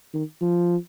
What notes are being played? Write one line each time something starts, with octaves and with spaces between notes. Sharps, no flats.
D#3
F3